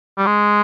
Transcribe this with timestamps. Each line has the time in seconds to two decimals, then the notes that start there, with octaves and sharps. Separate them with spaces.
0.18 G3
0.26 G#3